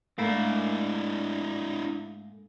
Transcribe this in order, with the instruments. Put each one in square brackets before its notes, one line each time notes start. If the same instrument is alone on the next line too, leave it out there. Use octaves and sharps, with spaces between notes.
[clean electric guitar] G#2 A3 A#3 [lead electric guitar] D4 E4